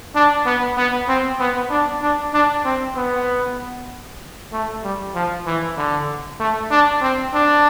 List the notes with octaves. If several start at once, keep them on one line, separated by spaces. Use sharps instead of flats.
D4
B3
B3
C4
B3
D4
D4
D4
C4
B3
A3
G3
F3
E3
D3
A3
D4
C4
D4